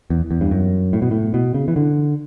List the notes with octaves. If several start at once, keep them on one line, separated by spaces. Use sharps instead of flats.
E2
E2
G2
F#2
A2
B2
A2
B2
C#3
E3
D3